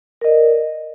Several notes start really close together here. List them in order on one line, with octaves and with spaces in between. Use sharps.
A#4 D#5 D5